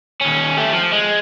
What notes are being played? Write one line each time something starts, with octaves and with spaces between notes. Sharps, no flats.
D#2 C#4
A3 G4
F3
G#3